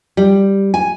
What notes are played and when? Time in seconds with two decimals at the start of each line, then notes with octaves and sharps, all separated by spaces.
0.17 G3
0.74 G#5